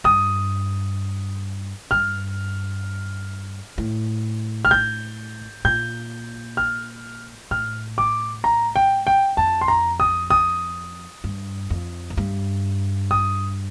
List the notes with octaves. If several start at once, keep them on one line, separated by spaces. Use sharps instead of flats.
G2 D#6
G2 F6
A2
F6
G6
A#2 G6
F6
A2 F6
D6
A#5
G5
G5
F2 A5
C6
A#5
D#6
D#6
G2
F2
A2
G2
D#6